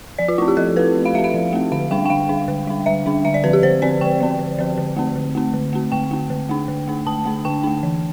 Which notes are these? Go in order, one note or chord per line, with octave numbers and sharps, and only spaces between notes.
F3 D5
F4
A3 C4 E4
G4
F3 A4
A3 C4 B4
F3
F5
A3 C4 E5
F5
F3
A3 C4
D3 F5
G3 D4 G5
G5
D3 F5
G3 D4
D3
G3 D4
D3 E5
G3 D4
D3 E5
D5
F3 C4 B4
G4
D3 C5
F3 C4 D5
D3 G5
F3 C4
D3
F3 C4
D3
A3 C4
D3
A3 C4
D3
A3 C4
D3 G5
A3 C4
D3
A3 D4
D3
A3 D4
D3 A5
A3 D4
D3 G5
A3 D4
E3